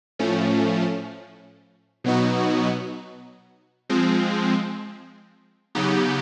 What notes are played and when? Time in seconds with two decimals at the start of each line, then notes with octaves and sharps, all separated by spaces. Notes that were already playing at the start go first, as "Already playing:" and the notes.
0.19 A2 F3 A3 C#4
2.04 B2 F#3 B3 D#4 F#4
3.90 F3 G#3 C4
5.75 C#3 F#3 B3 D#4 G4